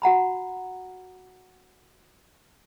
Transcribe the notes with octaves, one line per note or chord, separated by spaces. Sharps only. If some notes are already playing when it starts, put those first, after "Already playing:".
F#4 F#5 A#5 B5